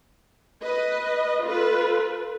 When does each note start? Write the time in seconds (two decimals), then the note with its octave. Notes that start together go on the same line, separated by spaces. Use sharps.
0.61 B4 D#5
1.41 F4 A4 B4